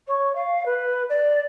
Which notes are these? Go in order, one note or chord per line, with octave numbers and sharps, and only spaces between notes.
C#5
F5
B4
D5